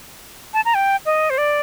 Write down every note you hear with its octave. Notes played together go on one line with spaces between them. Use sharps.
A5
A#5
G5
D#5
C5
D5